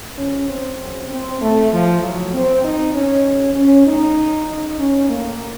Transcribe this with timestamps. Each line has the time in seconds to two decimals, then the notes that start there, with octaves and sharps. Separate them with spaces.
0.18 F2 C#3 C#4
0.49 C4
0.79 F#2 C#3
1.10 C4
1.40 A2 A3
1.71 F3
2.02 A2 F#3
2.33 C4
2.63 F#2 D#3 D#4
2.94 C#4
3.24 F#2 C#3
3.55 C#4
3.86 A2 D#4
4.47 F#2 C#3 D#4
4.78 C#4
5.09 A2 A#3